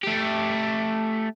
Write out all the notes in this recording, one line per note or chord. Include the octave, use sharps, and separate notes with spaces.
A3 G4